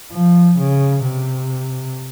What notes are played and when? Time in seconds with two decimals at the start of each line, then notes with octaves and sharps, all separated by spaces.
0.12 F3
0.58 C#3
1.05 C3